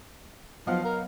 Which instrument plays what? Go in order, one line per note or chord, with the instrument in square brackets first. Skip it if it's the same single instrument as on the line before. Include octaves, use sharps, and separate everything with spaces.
[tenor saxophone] F3 [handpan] F#3 B3 [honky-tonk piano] D#5 F5 F#5
[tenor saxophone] A#4